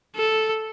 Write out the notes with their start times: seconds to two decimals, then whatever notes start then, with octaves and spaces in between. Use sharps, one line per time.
0.16 A4